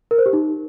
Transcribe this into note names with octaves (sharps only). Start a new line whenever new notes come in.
A#4
C5
G4
D#4